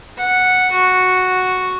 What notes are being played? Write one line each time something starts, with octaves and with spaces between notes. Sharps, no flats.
F#5
F#4